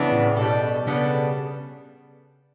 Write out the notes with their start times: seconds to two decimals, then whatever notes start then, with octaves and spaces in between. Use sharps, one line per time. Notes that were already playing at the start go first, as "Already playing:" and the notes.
Already playing: C#3 E3 B3 D4
0.11 A2
0.37 B2 G3 D4 A4
0.86 C#3 G3 B3 D4 A4